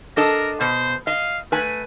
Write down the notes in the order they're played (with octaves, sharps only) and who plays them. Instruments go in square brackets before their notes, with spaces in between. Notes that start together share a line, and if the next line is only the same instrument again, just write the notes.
[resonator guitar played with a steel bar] D4 A4 D#5 [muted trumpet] A#4
[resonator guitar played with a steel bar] B2 [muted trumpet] C5
[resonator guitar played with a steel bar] D#5 [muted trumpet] F5
[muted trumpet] A3 [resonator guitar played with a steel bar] B4 G#5